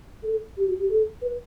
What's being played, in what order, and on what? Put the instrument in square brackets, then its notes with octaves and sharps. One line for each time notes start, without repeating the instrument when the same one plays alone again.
[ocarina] A4
G4
F#4
G4
A4
B4